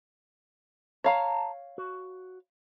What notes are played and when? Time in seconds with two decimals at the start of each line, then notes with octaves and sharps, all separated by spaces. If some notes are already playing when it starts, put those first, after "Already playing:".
1.04 C#5 F5 A5 A#5
1.78 F#4